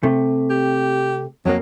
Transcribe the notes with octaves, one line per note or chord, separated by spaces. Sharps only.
C3 A3
G4
F2 F#3 A#3